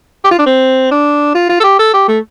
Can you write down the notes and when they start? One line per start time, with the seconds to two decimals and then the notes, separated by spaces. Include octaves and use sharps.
0.24 G4
0.31 F4
0.39 D4
0.46 C4
0.91 D4
1.35 F4
1.49 F4
1.60 A4
1.64 G4
1.79 A4
1.94 G4
2.08 A3